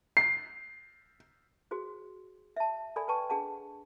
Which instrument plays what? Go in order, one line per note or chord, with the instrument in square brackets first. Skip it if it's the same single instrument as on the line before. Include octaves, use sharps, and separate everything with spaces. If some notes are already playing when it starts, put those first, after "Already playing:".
[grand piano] C7
[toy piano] F#4 G#4 C5
E5 A5
A4 D5 G#5 B5
B4 G5 A5 C#6
D4 G#4 F#5 A5